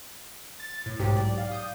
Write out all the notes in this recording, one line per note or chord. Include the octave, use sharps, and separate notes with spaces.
A6
A2
B1 G#2 F#3 G4
D5
F5
D#6 G6